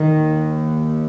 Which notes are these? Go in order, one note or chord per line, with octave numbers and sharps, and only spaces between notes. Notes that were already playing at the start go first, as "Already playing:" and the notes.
Already playing: D#3
D#2